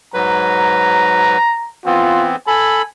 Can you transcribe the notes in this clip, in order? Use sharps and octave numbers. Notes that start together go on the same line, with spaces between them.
G#2 F#3 B4 A#5
E3 B3 C4 F4
A4 G#5 B5